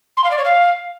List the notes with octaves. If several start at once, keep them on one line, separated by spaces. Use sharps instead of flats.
C6
F5
D5
C#5
F5